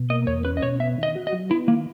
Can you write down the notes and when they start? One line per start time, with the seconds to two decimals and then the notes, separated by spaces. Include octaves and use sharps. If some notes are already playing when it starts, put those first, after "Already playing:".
Already playing: B2
0.10 A#3 D#5
0.27 E2 C#5
0.45 C#4 B4
0.57 D#5
0.63 B2 C#5
0.80 B3 E5
0.98 D#3 D#5
1.15 F#4
1.27 D#5
1.33 F#3
1.50 B3 E4
1.68 D#3 A#3